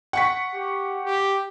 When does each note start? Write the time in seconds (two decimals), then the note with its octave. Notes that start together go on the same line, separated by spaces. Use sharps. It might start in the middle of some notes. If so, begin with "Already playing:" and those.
0.13 F#5 C#6 B6
0.54 G4
1.04 G4